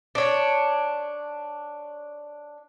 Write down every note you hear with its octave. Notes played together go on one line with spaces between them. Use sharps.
D4 C#5